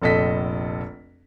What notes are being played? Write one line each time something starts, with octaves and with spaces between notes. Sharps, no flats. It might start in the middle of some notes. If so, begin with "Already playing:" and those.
F1 A#1 A4 D#5 B6